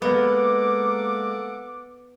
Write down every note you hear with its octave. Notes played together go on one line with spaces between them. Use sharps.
G#3 A#3 B3 A4 F#5 D6